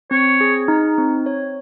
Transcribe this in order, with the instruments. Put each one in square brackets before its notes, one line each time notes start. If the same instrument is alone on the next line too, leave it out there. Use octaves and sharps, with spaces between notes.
[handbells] C4 [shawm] C#5
[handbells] G#4
D#4
C4
C#5